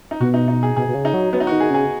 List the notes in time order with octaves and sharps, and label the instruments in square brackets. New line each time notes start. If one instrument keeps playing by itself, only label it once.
[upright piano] D#4
[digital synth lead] B2 [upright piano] F#4
[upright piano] D#4
D#4
G#4
[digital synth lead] B2 [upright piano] G#4
[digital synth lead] B2
C#3
[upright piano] D#4
[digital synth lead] F#3
[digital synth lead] F#3 [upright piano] B3
[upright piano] D#4
F#4
[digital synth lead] D#3
[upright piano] G#4
[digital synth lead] C#3 [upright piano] G#4